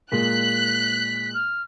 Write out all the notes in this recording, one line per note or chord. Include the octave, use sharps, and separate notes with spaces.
A#2 G#3 A#3 F#6 B6
F6